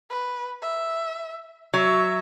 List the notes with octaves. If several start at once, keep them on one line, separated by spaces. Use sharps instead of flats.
B4
E5
F#3 E5